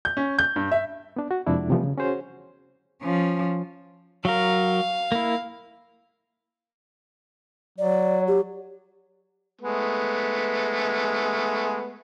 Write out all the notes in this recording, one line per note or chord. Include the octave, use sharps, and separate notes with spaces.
G6
C#4
G6
G2
E5
B3 D4
F#4
F2 C3 G#3 D4 E4
C3 E3 F3 G3 A3 B3
C#3
C#4 F#4 G#4 C5 C#5
F3 C#4
F#3 A#4 F5
A#3 E4
F#3 D5
G4
G#3 A3 B3